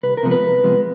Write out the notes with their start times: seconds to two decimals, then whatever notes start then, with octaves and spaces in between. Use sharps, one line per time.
0.03 C2 B4
0.17 A#4
0.23 C3 F3 G#3 B3
0.31 B4
0.43 C2
0.64 C3 F3 G#3 B3